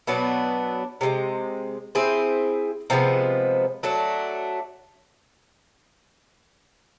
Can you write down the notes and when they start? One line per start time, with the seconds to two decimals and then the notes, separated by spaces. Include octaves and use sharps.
0.07 B2 F#3 B3 D4
1.01 C3 D#3 G#3
1.95 C4 E4 G#4 C5
2.90 C3 F3 G#3 B3
3.83 F#3 A3 D4